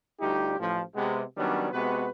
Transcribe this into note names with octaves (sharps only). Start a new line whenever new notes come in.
D2 G3 D#4 F4 G4
A1 F3
C3 G#3 B3
D#3 F#3 G3 B3 C#4 D4
C3 G#3 B3 F#4 B4